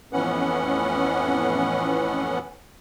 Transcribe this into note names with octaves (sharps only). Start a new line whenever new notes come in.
F2 A2 E3 B3 C#4 F#5